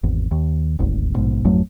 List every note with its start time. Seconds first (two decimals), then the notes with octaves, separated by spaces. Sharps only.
0.03 G#1 E2
0.31 D#2
0.79 D#1 G#1 D2
1.14 A#1 G#2 B2
1.45 G#1 F2 F#3 A3